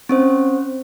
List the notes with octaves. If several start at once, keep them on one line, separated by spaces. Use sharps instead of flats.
C4 C#4 C5